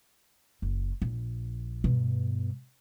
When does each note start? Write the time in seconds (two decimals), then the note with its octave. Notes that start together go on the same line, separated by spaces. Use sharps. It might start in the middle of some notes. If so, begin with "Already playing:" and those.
0.62 F#1
1.02 A#1
1.84 G2 B2